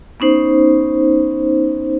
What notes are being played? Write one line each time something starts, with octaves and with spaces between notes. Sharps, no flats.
B3 C#4 D#4 C5